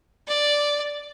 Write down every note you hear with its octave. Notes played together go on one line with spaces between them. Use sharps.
D5